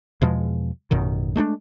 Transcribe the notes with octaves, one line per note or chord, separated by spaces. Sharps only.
E2 B2 F3 G#3
A1 F#2 B2 D#3
G#3 A3 C#4 D4